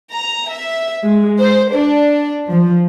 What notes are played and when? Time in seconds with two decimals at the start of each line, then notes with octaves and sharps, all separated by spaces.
0.14 A#5
0.49 E5
1.03 G#3
1.39 C5
1.73 D4
2.49 F3